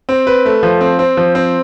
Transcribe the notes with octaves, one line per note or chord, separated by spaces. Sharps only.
C4
B4
A3
F3
C4
C4
F3
C4